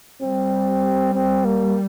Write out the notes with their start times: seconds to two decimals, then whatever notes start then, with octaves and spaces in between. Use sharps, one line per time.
0.21 G3 C4
1.14 C4
1.45 A#3